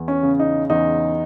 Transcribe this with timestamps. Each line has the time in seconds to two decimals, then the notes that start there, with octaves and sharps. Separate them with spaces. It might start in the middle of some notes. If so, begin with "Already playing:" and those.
Already playing: E2
0.08 C#4
0.23 C#3
0.40 D#4
0.70 E2 D#4